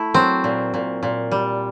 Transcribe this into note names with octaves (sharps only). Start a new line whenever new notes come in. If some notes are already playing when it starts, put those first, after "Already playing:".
Already playing: A3 E4
F#3 C4
A#2
A#2
A#2
G3